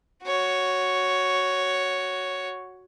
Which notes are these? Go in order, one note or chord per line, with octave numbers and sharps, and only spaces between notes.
F#4 C#5